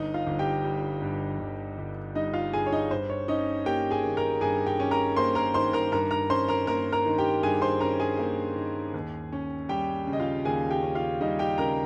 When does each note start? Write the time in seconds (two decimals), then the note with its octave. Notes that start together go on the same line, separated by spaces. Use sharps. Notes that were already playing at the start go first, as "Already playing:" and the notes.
Already playing: G1 D#4 D#5
0.14 F4 F5
0.27 G1
0.39 G4 G5
0.64 G3
1.02 G2
1.39 G1
1.78 G1
2.15 G3 D#4 D#5
2.34 F4 F5
2.53 G2 G#4 G#5
2.66 C#5
2.72 D#4 D#5
2.91 G2 C5
3.10 C#5
3.28 C#4 D#4 D#5
3.66 A#3 G4 G5
3.91 G#4 G#5
4.04 D#3
4.17 A#4 A#5
4.41 G2 G#4 G#5
4.66 G4 G5
4.80 C#4 G#5
4.91 A#4 A#5
5.16 A#3 C5 C6
5.35 A#4 A#5
5.54 D#3 C5 C6
5.73 A#4 A#5
5.92 G2 A#4 A#5
6.11 A#4 A#5
6.30 C#4 C5 C6
6.48 A#4 A#5
6.67 A#3 A#4 A#5
6.92 A#4 A#5
7.06 D#3
7.18 G4 G5
7.43 G2 G#4 G#5
7.62 C5 C6
7.80 C#4 A#4 A#5
8.00 G#4 G#5
8.19 A#3
8.56 D#3
8.94 D#2
9.33 C#4
9.69 G3 G4 G5
10.07 C#3
10.13 D#5
10.19 F4 F5
10.45 D#2 G#4 G#5
10.71 G4 G5
10.83 C#4
10.95 F4 F5
11.21 G3 D#4 D#5
11.39 G4 G5
11.58 C#3 A#4 A#5